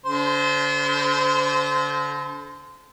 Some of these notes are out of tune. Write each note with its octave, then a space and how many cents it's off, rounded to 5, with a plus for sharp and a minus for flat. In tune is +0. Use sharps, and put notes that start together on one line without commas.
D3 -40 C5 -20